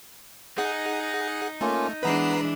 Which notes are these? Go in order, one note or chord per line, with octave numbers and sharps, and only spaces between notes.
D#4 G#4 F#5
A3 A#3 C#4 F4
E3 G#3 B3 D4 B4 A#5 C7